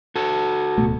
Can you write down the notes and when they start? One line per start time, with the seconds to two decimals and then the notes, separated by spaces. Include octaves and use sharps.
0.16 F#4 A4
0.78 D1 B2 A3